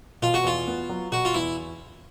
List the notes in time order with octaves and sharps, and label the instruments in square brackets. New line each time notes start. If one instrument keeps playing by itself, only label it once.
[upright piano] B2 [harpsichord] F4
[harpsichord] F#4
[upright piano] E2 [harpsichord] F4
[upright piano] B3
F#3
[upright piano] B2 [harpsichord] F#4
[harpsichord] F4
[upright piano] E2 [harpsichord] E4